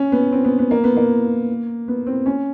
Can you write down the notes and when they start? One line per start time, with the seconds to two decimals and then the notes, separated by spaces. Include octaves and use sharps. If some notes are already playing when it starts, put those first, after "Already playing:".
Already playing: C#4
0.12 B3
0.32 C4
0.45 B3
0.59 B3
0.71 A#3
0.84 B3
0.97 A#3
1.88 B3
2.07 C4
2.26 C#4